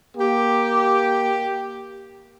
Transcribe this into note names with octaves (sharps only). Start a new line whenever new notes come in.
A#3 G4